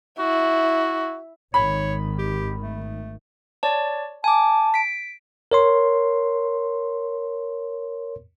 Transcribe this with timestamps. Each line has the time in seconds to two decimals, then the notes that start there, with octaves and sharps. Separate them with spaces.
0.19 E4 F#4
1.54 G#1 D#3 C#5 B5
2.19 G4
2.62 A3
3.63 C#5 D5 A5
4.24 G#5 A5 D6
4.74 B6 D7
5.52 A#4 C#5 C6